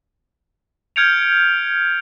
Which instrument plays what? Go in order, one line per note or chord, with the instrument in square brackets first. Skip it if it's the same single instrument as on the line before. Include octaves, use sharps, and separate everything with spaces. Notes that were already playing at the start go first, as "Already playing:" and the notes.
[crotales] F6 G6 G#6 C#7 D7 F7